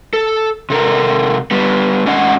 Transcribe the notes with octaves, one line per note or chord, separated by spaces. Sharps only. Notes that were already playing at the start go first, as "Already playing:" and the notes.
A4
C3 A4 A#4
G3 B3
G#2 C#4 D#5 F#5